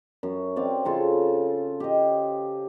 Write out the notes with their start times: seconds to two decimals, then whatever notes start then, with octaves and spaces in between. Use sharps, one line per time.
0.23 F#2
0.56 C4 D5 F5
0.85 C#3 F4 A4
1.80 G4 D#5